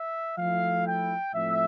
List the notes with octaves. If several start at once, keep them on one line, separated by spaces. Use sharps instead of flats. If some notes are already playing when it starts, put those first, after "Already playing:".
Already playing: E5
F3 A3 E4 F5
G5
A2 F3 A3 C4 E5